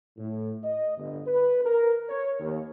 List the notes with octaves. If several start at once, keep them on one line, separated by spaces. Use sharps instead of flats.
A2
D#5
G1
B4
A#4
C#5
D#2